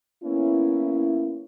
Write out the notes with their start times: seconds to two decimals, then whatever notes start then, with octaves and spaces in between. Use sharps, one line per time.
0.23 A#3 B3 C#4 E4